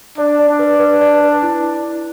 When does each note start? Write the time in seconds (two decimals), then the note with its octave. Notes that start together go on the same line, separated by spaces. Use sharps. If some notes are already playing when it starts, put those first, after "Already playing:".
0.18 D4 D5
0.39 D5
0.49 D4
0.59 B4
0.80 B4
1.01 D5
1.21 B4
1.43 E4